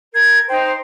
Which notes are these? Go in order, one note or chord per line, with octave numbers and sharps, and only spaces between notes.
A#4 G#6
D#4 C5 G5